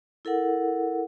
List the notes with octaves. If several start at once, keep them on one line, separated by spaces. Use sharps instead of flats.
E4 A4 A#4 F#5